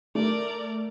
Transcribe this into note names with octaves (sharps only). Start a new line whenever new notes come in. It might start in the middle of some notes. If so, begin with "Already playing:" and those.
A3 A#4 D5